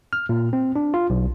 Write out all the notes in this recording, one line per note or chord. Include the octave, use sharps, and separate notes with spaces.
F6
A#2
C4
D4
F4
B1